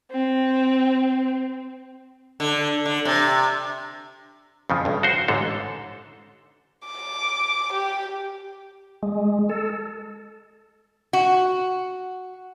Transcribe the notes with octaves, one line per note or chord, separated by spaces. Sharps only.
C4
D3
D3
C3
F2 C#3 F3
B1 G2
F#4 C5
A1 G#2 D3 A4
D6
G4
G#3
A4
F#4